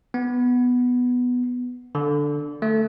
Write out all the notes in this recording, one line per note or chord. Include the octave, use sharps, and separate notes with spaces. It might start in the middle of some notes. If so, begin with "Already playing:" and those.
B3
D3
A3